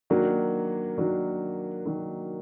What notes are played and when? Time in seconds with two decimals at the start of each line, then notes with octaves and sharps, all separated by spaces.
0.10 D#3 F#3 A#3 D4 F#4
0.98 D#3 F#3 A#3 D4 F#4
1.86 D#3 F#3 A#3 D4 F#4